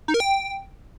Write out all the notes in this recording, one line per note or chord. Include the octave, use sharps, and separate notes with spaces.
D#4
A#4
G5